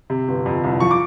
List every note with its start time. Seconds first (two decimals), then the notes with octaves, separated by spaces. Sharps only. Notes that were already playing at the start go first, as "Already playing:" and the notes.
0.10 C3
0.28 G1
0.46 F2
0.64 C2
0.80 F3 C#6
0.91 D6